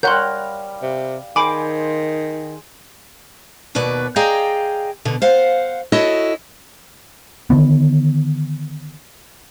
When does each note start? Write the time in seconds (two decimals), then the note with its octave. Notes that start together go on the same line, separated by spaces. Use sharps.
0.03 G3 A#4 C#5 F5 F#5 C6 F#6 G6
0.82 C3
1.36 D#3 G#4 C5 G#5 B5 D6
3.75 D#2 B2 F#4 B4 D5
4.16 G#4 D5 D#5 F5 G5 A#5
5.05 B2 D3
5.22 C5 F5 F#5
5.92 E4 F#4 A4 C#5 D#5
7.50 D3 D#3 B3